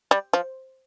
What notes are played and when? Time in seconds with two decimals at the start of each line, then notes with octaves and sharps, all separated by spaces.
0.11 G3
0.33 F3